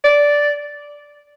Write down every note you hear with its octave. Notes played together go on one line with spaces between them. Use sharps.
D5